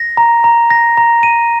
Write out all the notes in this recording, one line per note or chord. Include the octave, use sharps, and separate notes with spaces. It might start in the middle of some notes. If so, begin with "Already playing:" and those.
Already playing: A#6
A#5
A#5
A#6
A#5
D#7